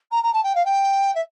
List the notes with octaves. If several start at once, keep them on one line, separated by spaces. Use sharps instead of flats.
A#5
A#5
A5
G5
F5
G5
E5